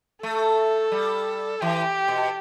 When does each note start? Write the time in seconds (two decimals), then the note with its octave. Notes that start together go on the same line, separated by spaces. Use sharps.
0.22 A3 A4
0.92 G3
1.61 E3 G4
2.08 B2